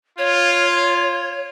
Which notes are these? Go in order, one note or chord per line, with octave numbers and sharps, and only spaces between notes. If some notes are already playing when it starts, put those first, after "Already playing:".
F4 C#5